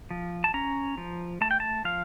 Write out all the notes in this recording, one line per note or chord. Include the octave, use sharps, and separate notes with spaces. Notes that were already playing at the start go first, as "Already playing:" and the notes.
F3
A5
C#4 A#5
F3
A3 A5
G5
A5
F3 F5